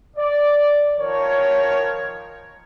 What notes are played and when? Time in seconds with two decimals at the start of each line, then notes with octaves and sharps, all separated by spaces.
0.17 D5
0.97 D#3 F3 A#4 C#5